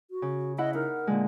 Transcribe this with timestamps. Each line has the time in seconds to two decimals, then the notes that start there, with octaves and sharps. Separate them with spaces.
0.11 F#4
0.22 C#3
0.58 E4 D#5 F#5 B5
0.75 D#4 A#4
1.07 A#2 D3 G#3